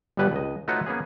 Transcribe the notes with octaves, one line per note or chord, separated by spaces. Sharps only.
G1 G2 B2 G3 B4 E5
C#2 D#5
A3 D#4 F4 F#4 B4 C#5
A#3 B3 C#4 G#4